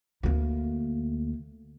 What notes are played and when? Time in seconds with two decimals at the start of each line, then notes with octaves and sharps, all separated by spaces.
0.23 D2 A#3